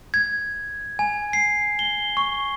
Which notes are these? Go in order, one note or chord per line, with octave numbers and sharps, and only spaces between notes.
G#6
G#5
C7
G7
C#6